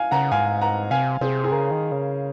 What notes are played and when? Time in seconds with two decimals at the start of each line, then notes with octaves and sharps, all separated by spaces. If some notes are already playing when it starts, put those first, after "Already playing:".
Already playing: F5 G#5
0.11 C#3 F#5 A#5
0.32 G#2 F5 G#5
0.61 F#5 A#5
0.91 C3 F5 G#5
1.21 C3 G#4 C5
1.44 G#4
1.52 C#3 A#4
1.71 D#3
1.92 C#3